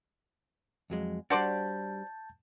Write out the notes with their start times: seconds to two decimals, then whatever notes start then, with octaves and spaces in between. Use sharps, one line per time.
0.90 F2 F#3 G#3
1.30 G3 D4 F#4 C5 D5 A5 G6 A6